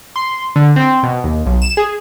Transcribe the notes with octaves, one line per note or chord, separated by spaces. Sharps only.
C6
D3
C4
B2
D#2
B1
E7
G#4